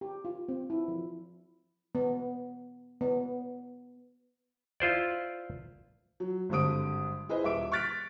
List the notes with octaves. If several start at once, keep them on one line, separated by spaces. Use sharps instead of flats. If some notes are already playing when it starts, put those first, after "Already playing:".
G4
F4
C4
E4
F3
B3
B3
E4 F4 C5 D5
F#3
G#1 G2 D3 C5 D#6 D7
E4 G#4 B4 C5 D#5
D#1 E5 D6 D7
C#6 F6 F#6 A6 B6 D7